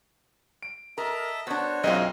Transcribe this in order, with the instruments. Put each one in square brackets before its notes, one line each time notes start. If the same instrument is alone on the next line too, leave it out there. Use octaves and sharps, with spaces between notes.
[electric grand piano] D7
[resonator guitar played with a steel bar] A#4 [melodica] D#5 E5 A5
[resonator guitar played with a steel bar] B3 D4 [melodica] F#4 C5 C#5
[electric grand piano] B1 F#2 D#5 [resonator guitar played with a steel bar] G#3 C4 F4